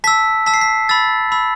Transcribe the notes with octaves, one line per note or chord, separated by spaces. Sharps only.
A5 E6 B6
A5 E6 B6
C7
B6
B5 E6 A6
B5 E6